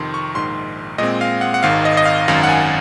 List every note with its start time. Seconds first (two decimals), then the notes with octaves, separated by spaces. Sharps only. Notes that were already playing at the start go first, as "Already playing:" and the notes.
Already playing: F2 C3 D#3 C6
0.14 C#6
0.35 A#1 G#2 D#3 C6
0.98 A#2 G#3 C4 D#5
1.21 F5
1.41 F#5
1.54 F#5
1.63 G#1 G#2 D#3 F5
1.85 D#5
1.97 D#5
2.05 F5
2.28 G#1 F#2 D#3 F5
2.43 F#5
2.49 G#5